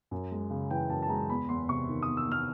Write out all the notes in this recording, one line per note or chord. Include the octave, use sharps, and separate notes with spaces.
F#2
G#3
C#3
E3 G5
F#2 A5
A5
G#3 A#5
E2 B5
E2 C6
C3 C#6
D#3
D#6
E2
E6
E2 F6